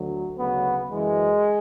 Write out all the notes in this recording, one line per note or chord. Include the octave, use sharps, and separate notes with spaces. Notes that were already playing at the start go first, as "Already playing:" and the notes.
Already playing: D2 D3 F#3
D2 C#3 F#3 B3
F#2 E3 G#3